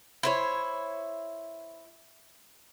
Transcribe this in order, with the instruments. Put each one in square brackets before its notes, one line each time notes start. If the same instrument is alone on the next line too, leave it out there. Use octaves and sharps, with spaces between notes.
[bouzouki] E4 C5 C#5